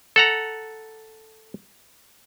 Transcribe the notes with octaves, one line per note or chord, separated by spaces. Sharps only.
A4 F#5 A#5